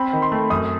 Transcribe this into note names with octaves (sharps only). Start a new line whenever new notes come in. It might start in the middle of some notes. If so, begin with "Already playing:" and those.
Already playing: C4 B5
D#3
C6
A3
F#2 D#6